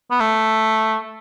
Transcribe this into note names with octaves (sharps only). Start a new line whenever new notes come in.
B3
A3